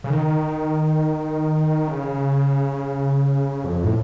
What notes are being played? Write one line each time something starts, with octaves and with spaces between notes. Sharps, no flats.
C#3
D#3
C#3
F2
A2